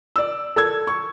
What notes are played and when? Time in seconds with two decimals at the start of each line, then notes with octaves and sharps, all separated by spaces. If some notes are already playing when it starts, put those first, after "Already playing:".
0.16 D5 E6
0.56 A4 E6 G#6
0.87 C#6